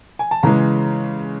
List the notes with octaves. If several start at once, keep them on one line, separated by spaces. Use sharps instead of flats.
G#5
A5
C#3 E3 G#3 A#5